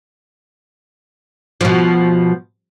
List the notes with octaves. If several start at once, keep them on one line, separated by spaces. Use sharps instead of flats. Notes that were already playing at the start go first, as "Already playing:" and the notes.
B2 F3